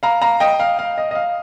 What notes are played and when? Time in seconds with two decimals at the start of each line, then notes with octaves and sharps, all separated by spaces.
0.03 F5 A#5
0.22 F5 A#5
0.40 D#5 G5
0.60 F5
0.79 F5
0.98 D#5
1.11 D#5
1.15 F5